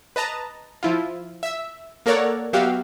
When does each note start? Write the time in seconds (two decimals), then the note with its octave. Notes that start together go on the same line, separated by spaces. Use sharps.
0.16 B4 D#5 A5 A#5
0.83 F3 E4 F4
1.43 E5 E6
2.06 A#3 A4 A#4 C#5 D5 F#5
2.53 F#3 B3 F#4 G4 E5 F5